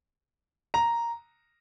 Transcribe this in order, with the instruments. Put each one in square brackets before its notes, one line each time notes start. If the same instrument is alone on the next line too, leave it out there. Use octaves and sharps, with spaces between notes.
[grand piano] A#5